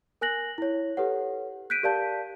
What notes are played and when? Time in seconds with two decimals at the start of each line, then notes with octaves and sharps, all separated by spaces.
0.21 A#4 G#5 F#6 A#6 F#7
0.58 E4 C#5
0.97 G4 A4 B4 C#5 F#5
1.70 F#6 G6 B6 D7 D#7
1.83 G4 A#4 D5 F5 A5 G6